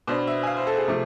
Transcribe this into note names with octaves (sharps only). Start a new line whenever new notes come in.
B2 B3 D4 C5
E5
G#5
F5
C5
A4
G#4
C3 F3 A3